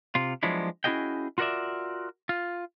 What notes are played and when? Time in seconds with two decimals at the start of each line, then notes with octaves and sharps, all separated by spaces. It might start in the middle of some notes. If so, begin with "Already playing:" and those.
0.15 C3 F4
0.43 F3 F#3 G#3 B3 D4 E4
0.84 C#4 E4 F#4 G#4 D#5 G5
1.38 F4 F#4 A#4 C#5 D5 E5
2.29 F4